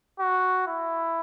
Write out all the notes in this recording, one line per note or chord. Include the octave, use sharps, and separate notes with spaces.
F#4
E4